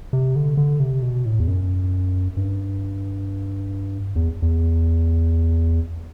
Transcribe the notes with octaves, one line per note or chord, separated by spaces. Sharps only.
C3
D3
D3
C3
B2
A2
E2
F#2
G2
E2
E2